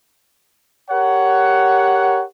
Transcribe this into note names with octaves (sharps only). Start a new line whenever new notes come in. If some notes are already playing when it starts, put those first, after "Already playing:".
G4 A#4 C#5 F#5